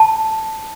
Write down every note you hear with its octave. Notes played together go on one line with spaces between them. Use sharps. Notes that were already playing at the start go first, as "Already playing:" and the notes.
Already playing: A5